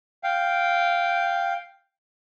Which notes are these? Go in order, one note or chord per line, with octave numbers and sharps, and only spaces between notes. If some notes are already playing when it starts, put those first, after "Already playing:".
F5 G5